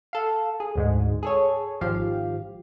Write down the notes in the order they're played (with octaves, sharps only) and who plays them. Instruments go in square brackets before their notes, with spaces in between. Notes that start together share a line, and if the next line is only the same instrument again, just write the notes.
[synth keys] A4 F5
G#4
D2 G#2 G#3
G#4 A4 C#5
G#1 F3 G4 F5